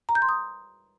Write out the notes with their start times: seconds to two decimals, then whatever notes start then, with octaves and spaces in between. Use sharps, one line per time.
0.09 A#5
0.15 G6
0.22 C6
0.29 D#6